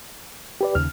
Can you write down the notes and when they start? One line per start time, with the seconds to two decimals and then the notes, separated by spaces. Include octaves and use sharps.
0.61 G4 B4 D5
0.75 D#2 C#3 F6